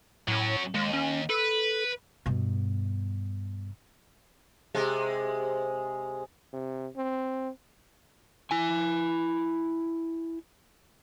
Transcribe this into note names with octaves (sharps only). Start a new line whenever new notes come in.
A2 F#3 C#4
D#2 G#3
C#4
A4 B4
G2 B2
C3 G#3
C3
C4
E4 G#5